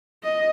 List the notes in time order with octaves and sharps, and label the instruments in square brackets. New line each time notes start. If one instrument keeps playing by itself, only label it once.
[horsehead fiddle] D#5